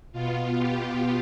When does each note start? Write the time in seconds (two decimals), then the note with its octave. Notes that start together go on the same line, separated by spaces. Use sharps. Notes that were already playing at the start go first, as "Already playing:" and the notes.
0.12 B2 B3 F4
0.58 G4